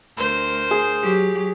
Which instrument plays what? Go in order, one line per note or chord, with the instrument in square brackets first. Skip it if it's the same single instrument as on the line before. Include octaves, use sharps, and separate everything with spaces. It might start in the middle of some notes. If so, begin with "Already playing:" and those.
[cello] D2 [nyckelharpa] A#4 C5
[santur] G#4
[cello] F#3 G4